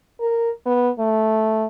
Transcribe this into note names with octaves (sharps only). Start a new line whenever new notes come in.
A#4
B3
A3